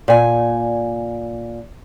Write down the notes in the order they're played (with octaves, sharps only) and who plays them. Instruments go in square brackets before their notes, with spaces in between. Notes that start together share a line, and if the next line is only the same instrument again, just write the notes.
[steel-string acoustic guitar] A#2 G#5